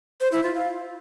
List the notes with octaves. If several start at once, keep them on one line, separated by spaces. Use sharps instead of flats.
C5
E4
F4
F5